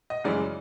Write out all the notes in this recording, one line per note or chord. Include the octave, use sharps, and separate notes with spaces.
D#5
F#2 C#3 E3 G#3 D5